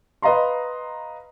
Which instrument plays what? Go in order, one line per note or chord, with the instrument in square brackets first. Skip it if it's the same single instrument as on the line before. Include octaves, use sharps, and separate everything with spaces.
[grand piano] B4 D#5 F5 A#5 C6